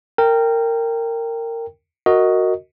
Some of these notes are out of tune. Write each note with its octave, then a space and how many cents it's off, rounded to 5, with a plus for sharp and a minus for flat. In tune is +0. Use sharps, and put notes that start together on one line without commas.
A#4 -20 G5 +5
F#4 +0 A#4 -15 D#5 +10